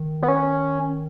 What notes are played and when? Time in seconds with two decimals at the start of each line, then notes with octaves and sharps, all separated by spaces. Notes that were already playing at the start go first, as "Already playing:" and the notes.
Already playing: D#3
0.22 B3
0.28 C#4